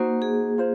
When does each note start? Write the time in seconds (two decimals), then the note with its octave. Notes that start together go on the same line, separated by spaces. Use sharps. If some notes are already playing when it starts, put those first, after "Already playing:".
Already playing: A#3 D#4 F#4 C5
0.22 G#4
0.58 F4 C5